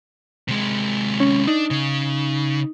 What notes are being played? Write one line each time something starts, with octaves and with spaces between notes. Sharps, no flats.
C3 G#3
C#4
D4 D#4
C#3